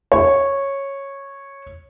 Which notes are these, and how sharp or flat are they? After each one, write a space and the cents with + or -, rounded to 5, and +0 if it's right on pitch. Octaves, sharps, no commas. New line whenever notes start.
C#5 -10